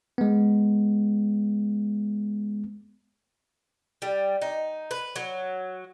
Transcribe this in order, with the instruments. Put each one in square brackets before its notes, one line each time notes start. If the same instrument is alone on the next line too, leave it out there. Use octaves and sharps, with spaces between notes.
[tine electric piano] G#3 B3
[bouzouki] G3
D#4
B4
F#3